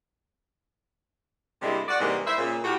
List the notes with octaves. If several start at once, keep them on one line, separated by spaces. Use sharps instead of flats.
G2 C3 G3 G#3 A#3 E4
F#4 D5 F#5
G#2 C3 E3 G3 G#3 A#3
C5 E5
A#2 C#3
A2 F#4 G4